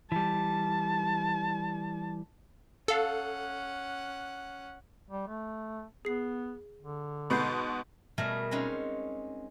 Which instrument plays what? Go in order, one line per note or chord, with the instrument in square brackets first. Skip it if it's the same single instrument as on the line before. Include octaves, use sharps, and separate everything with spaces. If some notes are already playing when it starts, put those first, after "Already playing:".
[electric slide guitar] E3 G3 [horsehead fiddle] A5
[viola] C#4 F#5 [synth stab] A4 F5
[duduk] G3
A3
[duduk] B3 [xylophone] G#4 C7
[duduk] D3
[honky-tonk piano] G#2 B2 B3 [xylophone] B5 G6 C7
[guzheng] B2 G3 A3 G#4 A#4
G#3 C4 C#4 D#4